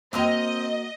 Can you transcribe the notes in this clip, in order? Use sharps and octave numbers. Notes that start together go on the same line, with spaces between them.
A#3 C4 F#4 D#5 A#5